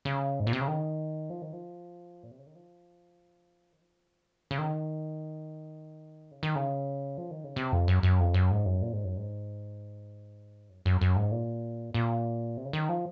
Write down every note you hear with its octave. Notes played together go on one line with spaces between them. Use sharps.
C#3
G#2
A#2
C3
C#3
D#3
F3
D#3
F3
A#2
C3
C#3
D#3
F3
D#3
F3
D#3
C#3
D#3
C#3
D#3
C#3
F3
D#3
C#3
C3
F2
F#2
F#2
F2
F#2
G#2
F#2
A#2
G#2
F#2
G#2
F#2
F#2
F#2
G#2
A#2
A#2
C3
C#3
D#3
F3